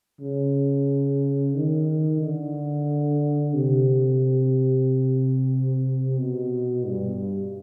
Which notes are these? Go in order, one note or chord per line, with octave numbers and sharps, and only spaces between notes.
C#3
D#3
D3
C3
B2
G2